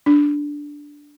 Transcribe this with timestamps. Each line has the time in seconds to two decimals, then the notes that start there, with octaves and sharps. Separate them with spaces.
0.06 D4